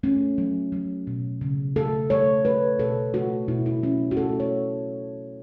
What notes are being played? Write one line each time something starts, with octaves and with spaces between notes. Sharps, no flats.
A3 C#4
F#3
F#3
B2
C#3
A3 A4
A3 C#5
A3 B4
B2 A4
A3 F#4
B2 E4
E4
F#3 C#4
F#4
A3 A4
C#5